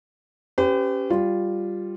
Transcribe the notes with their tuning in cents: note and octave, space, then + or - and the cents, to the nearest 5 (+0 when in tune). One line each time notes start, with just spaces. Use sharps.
C#4 +0 G4 +0 B4 +45
G3 +0 F4 +0